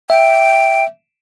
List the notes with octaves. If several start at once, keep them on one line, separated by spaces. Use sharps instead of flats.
E5 G5